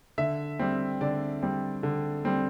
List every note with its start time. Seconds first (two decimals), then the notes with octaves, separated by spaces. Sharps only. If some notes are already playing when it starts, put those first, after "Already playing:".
0.18 D3 E5
0.59 G3 C4
1.01 D3 D5
1.42 G3 C4
1.83 D3
2.25 G3 C4